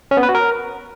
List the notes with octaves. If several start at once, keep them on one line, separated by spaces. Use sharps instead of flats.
C#4
B3
B4
F#4
A#4